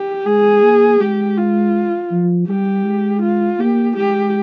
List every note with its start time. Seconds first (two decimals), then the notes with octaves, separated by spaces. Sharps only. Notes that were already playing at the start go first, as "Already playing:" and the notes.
Already playing: G4
0.26 G#3 G#4
0.63 A#3
1.00 G#3 G4
1.37 F4
2.11 F3
2.49 G3 G4
2.85 G#3
3.22 F4
3.59 A#3 G4
3.96 G#3 G4